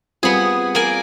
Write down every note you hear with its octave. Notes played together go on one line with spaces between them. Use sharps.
G3 B3 C4 F4 G#4
A#3 D5 G#5